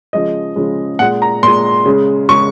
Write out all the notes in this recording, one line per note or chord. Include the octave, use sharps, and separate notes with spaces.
C#3 F3 G#3 D#5
C#3 F3 G#3
A#2 G#3 F#5
A#5
A#2 G#3 C6
C#3 G#3
C#3 G#3 C#6